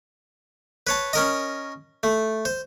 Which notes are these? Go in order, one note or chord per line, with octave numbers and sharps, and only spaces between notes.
B4 C#5 A5
C#4 A#4 D#5
A3
C5